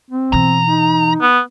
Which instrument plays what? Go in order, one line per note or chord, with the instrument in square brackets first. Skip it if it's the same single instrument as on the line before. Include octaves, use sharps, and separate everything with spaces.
[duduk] C4
[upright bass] B2 E3 [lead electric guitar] A#5
[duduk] D#4
[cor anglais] B3